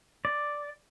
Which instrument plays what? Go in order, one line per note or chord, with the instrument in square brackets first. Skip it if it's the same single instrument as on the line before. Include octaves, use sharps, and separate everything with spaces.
[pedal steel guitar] D5